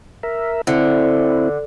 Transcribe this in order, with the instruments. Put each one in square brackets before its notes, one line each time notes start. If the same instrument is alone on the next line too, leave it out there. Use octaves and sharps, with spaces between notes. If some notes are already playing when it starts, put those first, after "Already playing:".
[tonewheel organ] A#4 E5
[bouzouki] D3 [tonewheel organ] C4 E4